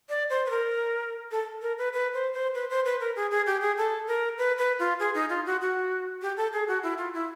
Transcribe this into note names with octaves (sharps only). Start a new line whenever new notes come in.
D5
C5
B4
A#4
A4
A#4
B4
B4
C5
C5
B4
C5
B4
A#4
G#4
G#4
G4
G#4
A4
A#4
B4
B4
F4
G#4
D#4
F4
F#4
F#4
G4
A4
G#4
F#4
E4
F4
E4